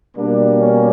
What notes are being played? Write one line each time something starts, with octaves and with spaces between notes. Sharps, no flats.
B2 G3 A#3 D4
C#4